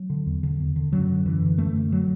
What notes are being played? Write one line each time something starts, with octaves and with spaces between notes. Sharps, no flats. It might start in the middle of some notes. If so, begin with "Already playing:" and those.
Already playing: F#3
D3
E2
D3
E2
D3
F#2 F#3
D3
F#2 E3
D3
F#2 A3
D3
F#3